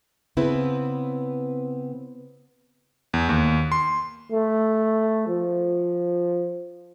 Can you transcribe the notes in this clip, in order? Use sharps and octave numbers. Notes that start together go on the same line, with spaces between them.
C#3 B3 C4 E4 B4
E2
D#2
C6
A3
F3